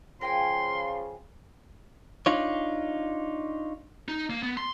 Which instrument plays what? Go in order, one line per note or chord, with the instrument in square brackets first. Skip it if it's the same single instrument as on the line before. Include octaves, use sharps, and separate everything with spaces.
[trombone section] C#3 F3 [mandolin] A#4 G5 G#5 [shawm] C6
[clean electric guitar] D4 D#4 F4 C#5
[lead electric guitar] D#4
A#3
B3
C6